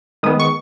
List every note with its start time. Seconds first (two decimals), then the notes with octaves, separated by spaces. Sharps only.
0.23 D#3 G#3 B3 D#6
0.40 C#6